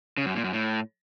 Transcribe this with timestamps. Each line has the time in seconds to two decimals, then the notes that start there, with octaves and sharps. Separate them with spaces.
0.17 C#3
0.26 F#2
0.35 A#2
0.44 F#2
0.53 A2